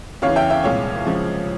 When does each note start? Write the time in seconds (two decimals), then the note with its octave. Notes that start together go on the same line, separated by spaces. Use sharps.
0.22 E2 C#3 E3 C#5 F5
0.36 E5 G5
0.50 E5 G5
0.64 C2 A#2 G#3 C#5 F5
1.06 C#2 C#3 F3 G#3